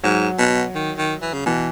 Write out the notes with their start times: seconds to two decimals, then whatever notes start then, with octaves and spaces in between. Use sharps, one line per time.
0.04 G#2 F#3
0.38 B2
0.75 D#3
0.98 D#3
1.22 E3
1.34 C#3
1.46 B2 E3